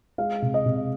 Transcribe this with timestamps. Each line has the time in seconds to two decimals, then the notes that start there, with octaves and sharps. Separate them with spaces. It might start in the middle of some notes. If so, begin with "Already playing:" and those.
0.18 G#3 F5
0.42 C3
0.54 D#5
0.66 C3